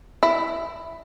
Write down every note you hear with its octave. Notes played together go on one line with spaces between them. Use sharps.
E4